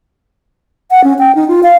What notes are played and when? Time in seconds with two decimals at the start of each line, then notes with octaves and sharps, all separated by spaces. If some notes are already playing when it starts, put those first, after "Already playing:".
0.91 F#5
1.04 C#4
1.19 G5
1.35 D#4
1.48 F4
1.63 F5